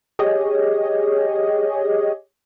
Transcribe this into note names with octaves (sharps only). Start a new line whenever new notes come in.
G4 G#4 C#5 D#5